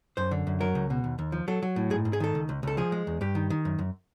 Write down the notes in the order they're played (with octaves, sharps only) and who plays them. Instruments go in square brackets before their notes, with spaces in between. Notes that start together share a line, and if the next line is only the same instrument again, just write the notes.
[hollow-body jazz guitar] F#2 C5
D3
F#2
F#3 A#4
C#2
B2
D#2
D#2
F3
F#3 A4
F#3
A2
G#2 G#4
G#2
G#4
D#3 A4
C#2
C#2
C#2 A4
F3 G#4
G#3
E2
G2 G4
D#3
D#3
F#2
F#2